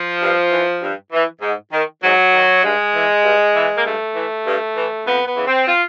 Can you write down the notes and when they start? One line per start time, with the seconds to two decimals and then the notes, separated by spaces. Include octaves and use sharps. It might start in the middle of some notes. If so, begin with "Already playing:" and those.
Already playing: F3
0.21 G2
0.51 E3
0.81 G2
1.12 E3
1.41 G#2
1.72 D#3
2.02 G#2 F#3
2.33 D#3
2.63 G2 G#3
2.94 E3
3.24 G2
3.54 E3
3.77 A#3
3.85 G2 A3
4.15 E3
4.46 G2
4.76 E3
5.06 F2 B3
5.26 B3
5.37 C#3 E3
5.47 C4
5.67 F4